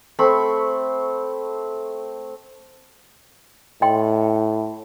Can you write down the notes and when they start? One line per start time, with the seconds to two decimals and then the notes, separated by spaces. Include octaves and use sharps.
0.19 A3 C4 B5 C#6
3.82 A2 D#5 G5 C6